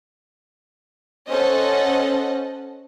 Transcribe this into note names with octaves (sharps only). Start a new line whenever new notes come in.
C#4 A4 C5 D#5 F#5